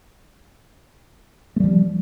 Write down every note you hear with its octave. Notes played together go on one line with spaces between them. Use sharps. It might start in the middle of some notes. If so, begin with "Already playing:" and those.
F3 G3 A3